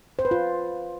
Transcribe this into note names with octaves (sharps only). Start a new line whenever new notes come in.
C5
B4
F4